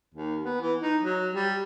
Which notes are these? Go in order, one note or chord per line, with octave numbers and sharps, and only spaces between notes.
D#2
B3
E3
D#4
F#3
G3